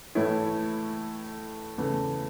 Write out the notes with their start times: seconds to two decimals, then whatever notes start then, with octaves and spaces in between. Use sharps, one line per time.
0.15 A2 E3 A3 E4 C#5
1.78 E2 C#3 E3 A3